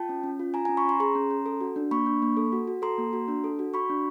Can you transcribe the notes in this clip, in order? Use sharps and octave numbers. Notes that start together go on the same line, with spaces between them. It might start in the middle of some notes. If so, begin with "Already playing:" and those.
Already playing: F4 G5 A5
C#4
C#4
F4
F4 G#5 A#5
G#5 A#5
C#4
B5 C#6
C#4 A#5 C6
G#4 A#5 C6
C#4
C#4
A4
F#4
D4
A#3 B5 C#6
D4
A#3
A4
F#4
F#4
A4 A#5 C6
A#3
F#4
D4
A4
F#4
F#4 B5 C#6
D4